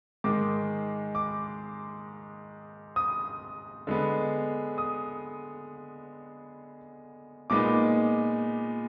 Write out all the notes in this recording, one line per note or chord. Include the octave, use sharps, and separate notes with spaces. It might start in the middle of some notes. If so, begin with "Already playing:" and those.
G#2 D#3 G#3 D6
D6
D#6
D3 G#3 B3
D#6
A#2 G#3 B3 D#4 D6